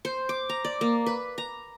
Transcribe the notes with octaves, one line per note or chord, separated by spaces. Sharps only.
C5
D6
A#5
D5
A#3
B4
A#5